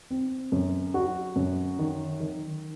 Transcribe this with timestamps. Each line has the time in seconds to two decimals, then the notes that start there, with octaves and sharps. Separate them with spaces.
0.10 C4
0.52 F#2
0.94 F#4
1.36 F#2
1.79 D#3
2.20 D#3